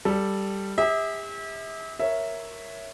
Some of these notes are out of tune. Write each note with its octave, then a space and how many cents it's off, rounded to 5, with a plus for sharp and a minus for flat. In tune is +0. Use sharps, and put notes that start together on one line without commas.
G3 +0 A4 +0
G4 +45 E5 -30
A#4 +0 C#5 +0 E5 +0